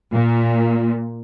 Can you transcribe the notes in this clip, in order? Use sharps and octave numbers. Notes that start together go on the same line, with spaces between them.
A#2